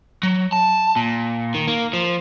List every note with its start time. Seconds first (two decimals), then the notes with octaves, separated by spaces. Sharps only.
0.23 F#3
0.52 A5
0.96 A#2
1.54 D#3
1.68 A#3
1.93 F3